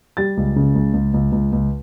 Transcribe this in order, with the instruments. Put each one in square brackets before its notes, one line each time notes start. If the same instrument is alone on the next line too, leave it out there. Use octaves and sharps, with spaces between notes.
[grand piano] G3 A6
C#2
C#3
C#2
C#2
C#2
C#2
C#2